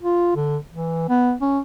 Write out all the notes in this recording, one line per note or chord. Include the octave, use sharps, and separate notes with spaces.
F4
D3
E3
B3
C#4